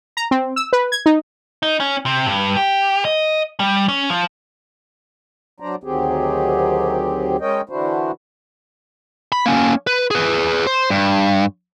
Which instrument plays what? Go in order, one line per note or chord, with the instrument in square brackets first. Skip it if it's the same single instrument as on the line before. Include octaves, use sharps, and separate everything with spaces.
[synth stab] A#5
C4
E6
B4
G#6
D#4
[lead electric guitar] D#4
C#4
C3
G2
G4
D#5
G3
C#4
F3
[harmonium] F#3 D4 C5 D5 A#5
D2 D#3 F#3 C4 G4 G#4
G#3 C#4 A#4 C#5 D#5 G5
D3 E3 D4 E4 F#4 C5
[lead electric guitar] B5
A#3 C#4
B4
G#4 B4
C5
G2